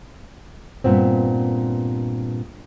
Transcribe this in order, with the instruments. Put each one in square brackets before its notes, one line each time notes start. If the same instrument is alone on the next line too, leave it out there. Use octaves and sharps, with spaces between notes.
[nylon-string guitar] G2 A#2 B3 C4